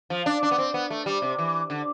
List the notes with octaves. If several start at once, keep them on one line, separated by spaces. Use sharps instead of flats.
F3
D4
D4
B3
C4
B3
A3
G3
C3
E3
D3